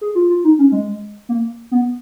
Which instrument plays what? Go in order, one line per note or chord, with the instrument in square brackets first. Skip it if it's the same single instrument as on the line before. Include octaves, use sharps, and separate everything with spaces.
[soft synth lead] G#4
F4
F4
D#4
C#4
G#3
A#3
B3